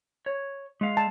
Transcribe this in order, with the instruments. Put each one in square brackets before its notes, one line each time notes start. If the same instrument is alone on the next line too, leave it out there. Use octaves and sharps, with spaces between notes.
[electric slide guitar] C#5
G#3 F5
[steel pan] A5